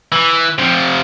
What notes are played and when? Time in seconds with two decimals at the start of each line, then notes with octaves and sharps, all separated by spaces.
0.12 E3
0.59 C3 F3